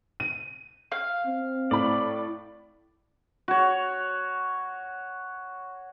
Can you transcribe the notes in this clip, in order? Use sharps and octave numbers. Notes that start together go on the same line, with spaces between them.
D#7
F5
C4
A2 D5 B5
F#4 C#5